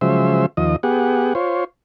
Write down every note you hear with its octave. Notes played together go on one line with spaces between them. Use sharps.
C#3 F3 F#3 G#3 C5 E5
D#2 F3 D#5
B3 G4 G#4 F#5
F4 C5 C#5